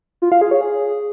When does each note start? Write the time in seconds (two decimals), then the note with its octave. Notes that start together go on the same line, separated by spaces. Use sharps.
0.22 F4
0.32 F5
0.41 G#4
0.51 C#5
0.61 G#4